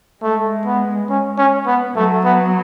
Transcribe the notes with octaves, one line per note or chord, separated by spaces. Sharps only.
G#3 A3
B3
C#4
C#4
B3
F#3 A3
B3